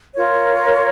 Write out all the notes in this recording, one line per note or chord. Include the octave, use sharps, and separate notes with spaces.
F4 A#4 C#5